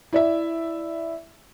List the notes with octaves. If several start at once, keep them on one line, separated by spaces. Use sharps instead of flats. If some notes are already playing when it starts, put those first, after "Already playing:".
E4 D5 E5